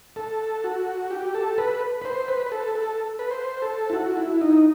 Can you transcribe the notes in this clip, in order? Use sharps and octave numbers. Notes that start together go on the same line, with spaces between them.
A4
F#4
G4
A4
B4
B4
C5
B4
B4
A4
A4
B4
C5
A4
E4
F#4
E4
D#4